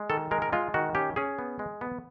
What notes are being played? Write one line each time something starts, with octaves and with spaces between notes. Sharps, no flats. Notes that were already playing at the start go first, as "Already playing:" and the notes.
Already playing: G#3
D#3 A4
G#3 A#4
A#4
G#3 F4
D#3 F#4
C#4 G4
C#4 G#4
B3
G#3
B3